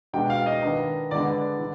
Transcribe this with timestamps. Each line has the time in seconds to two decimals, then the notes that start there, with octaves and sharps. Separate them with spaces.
0.13 B2 G#3 D4 G5
0.30 F5
0.46 D#5
0.62 D#3 B3 D4
1.11 D3 G#3 B3 D4 D5
1.60 D3